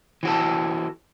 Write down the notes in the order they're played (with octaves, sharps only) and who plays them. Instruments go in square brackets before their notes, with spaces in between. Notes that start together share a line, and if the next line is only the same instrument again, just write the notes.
[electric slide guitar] E3 F#4 A4